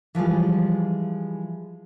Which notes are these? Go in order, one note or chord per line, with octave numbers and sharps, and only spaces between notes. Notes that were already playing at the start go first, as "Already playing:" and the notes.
E3 F3 G3 G#3